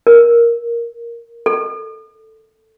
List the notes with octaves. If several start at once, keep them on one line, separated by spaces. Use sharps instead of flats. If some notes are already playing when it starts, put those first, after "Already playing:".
A#4
A4